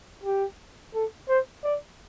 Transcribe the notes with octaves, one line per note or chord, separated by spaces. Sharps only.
G4
A4
C5
D5